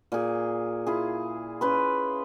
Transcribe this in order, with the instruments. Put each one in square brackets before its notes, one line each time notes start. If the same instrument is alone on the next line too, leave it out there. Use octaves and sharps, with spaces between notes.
[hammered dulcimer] A#2 G#4
E4 F4 G#4
C#4 B4 C6